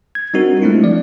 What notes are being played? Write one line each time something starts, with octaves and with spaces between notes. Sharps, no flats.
G#6
G3 C4 D4 D#4 F#4 A#4
G#3 A3 C4 D4 E4 F4
F3 D5